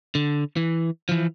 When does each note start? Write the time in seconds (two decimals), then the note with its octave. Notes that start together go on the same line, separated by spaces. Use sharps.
0.15 D3
0.56 E3
1.09 E3 F3